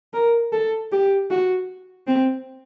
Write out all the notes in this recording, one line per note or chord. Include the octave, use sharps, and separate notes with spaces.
A#4
A4
G4
F#4
C4